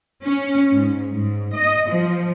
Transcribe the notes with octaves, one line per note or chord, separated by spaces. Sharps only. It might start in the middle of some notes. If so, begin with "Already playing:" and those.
C#4
G#2
G#2
D#5
F3